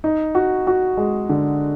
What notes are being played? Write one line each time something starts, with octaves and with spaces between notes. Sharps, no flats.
D#4
F#4
F#4
G#3
D3